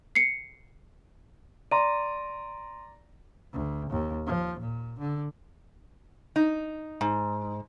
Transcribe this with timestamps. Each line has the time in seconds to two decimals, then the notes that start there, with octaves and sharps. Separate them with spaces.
0.15 C7 C#7
1.71 D5 A#5 C6 D#7
3.53 D2
3.90 D#2
4.27 F3
4.60 A#2
4.99 D3
6.36 D#4
7.01 G#2